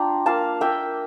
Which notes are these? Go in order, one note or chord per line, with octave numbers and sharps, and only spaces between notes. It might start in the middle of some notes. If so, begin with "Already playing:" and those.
Already playing: D4 F4 G5 A#5
A#3 F5 A5
A#3 E5 G5